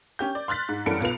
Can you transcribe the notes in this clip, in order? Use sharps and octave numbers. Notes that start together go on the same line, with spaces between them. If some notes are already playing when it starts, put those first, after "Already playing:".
C#4 G4 G6
D5
C6 F6 F#6 A6 B6
G#2
F#2 E3 G3 A4 C#7 D7
B1 F4 B4 F7